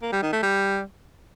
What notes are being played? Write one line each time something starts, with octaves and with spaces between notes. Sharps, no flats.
A#3
G3
D#3
A3
G3